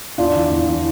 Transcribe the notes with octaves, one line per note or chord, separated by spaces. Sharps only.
E2 D4 F4
E3
E2
E3